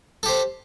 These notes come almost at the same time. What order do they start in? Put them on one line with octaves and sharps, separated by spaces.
A4 G4 C5